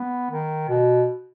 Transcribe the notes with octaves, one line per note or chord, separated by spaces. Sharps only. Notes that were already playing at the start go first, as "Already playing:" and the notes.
Already playing: B3
D#3
B2